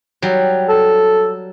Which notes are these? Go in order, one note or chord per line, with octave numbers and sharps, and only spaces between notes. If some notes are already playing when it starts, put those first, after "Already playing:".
F#3 G3
A4